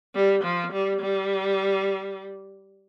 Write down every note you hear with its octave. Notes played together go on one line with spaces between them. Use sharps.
G3
F3
G3
G3